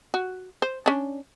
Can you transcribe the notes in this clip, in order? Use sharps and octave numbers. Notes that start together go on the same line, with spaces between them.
F#4
C5
C#4 D4